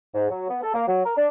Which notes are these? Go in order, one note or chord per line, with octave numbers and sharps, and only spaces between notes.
G#2
F#3
B3
A4
A#3
F#3
A#4
D4